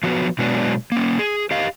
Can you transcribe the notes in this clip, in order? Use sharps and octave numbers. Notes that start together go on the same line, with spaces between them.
F3 F#3 B3 F#4
B2 F#3 G#3 B3 D4 F#4
A#3 C#4
G#4
G4 D#5 F5